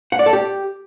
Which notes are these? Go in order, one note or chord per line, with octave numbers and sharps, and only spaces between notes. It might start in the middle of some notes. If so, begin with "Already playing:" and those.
F#5
D5
A4
G4